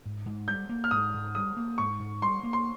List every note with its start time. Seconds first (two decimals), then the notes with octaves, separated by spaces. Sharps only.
0.06 G#2
0.26 G#2
0.48 G3 G6
0.69 A#3
0.84 F6
0.91 G#2 D#6
1.14 G#2
1.35 G3 D#6
1.57 A#3
1.78 G#2 C#6
1.99 G#2
2.22 G3 C6
2.43 A#3
2.53 C6